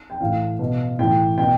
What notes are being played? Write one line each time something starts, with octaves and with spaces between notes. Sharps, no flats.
G5
A2 E3 F5
B2
A2 E3 G5
B2 G5